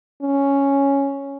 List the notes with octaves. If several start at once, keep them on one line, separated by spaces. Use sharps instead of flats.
C#4